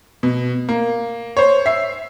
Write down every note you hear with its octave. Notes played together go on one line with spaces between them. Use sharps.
B2
A#3
C5 C#5
E5 C7